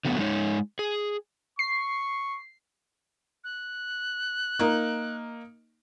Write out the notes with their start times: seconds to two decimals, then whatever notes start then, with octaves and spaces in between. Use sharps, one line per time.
0.05 D3 F#3 A3 B3
0.19 G#3 D#4 C#5
0.79 G#4
1.59 C#6 C7
3.44 F#6
4.59 A#3 D#4